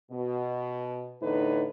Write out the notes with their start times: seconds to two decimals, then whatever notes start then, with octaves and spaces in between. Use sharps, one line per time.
0.11 B2
1.21 E2 A2 D3 D#4 B4